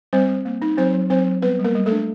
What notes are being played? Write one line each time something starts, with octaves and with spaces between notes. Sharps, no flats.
G3 C4 C5
G3
A#3
D#4
F#3 C4 C5
F#3
F#3 C4 C5
F#3
G3 B3 B4
G3
A#3 A#4
G3
A3 A4
D4